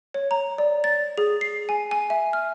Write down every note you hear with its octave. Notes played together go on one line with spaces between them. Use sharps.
C#5
A#5
D5
A6
G#4
C7
G#5
G#5
E5
F6